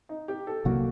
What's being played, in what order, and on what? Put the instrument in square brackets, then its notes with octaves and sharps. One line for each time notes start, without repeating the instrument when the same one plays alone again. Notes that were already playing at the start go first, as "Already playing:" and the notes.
[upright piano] D#4
G4
A4
[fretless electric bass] C2 C3 F#3 A#3 [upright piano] F#4